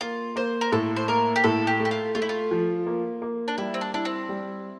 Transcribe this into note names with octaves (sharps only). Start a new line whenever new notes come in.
A#3 F4
A#3 C5
A#4
A2 A4
C5
A#3 A#4
G4
A2 A4
G4
A3
G4
F4
A3 F4
E4
F4
F3
A#3
A#3
D4
G3 E4
C4
D4
D4 E4
C4
G3